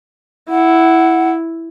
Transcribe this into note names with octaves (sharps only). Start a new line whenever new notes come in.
E4 F#5